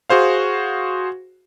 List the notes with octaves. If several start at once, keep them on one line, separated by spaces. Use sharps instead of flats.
F#4 G#4 C5 F5